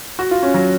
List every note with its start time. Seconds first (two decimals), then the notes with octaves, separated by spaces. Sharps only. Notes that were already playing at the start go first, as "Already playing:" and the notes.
0.19 F#4
0.31 F4
0.43 C#4
0.54 F#3